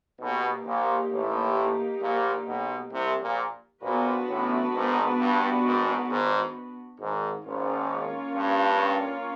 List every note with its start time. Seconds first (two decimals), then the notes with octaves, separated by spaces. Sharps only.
0.20 B1 B2 A#3 D#4 G4
0.65 A#1 A#2
1.11 A1 A2
2.01 A#1 A#2
2.47 B1 B2
2.92 C2 C3
3.22 A#1 A#2
3.82 A#1 A#2 B3 D4 F#4 B4
4.28 A1 A2
4.73 G#1 G#2
5.19 G2
5.64 G#1 G#2
6.09 G#1 G#2
7.00 G#1 G#2
7.44 G#1 G#2 A#3 C#4 F4 A#4 C#5
8.35 G2